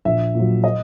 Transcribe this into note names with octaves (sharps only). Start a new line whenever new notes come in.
A#1 E5
A#2 F#3
D#5